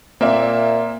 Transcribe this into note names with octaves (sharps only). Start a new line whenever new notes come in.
A#2 A#3 C4 D5 E5